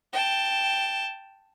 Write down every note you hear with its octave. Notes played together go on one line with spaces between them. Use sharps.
G5 A5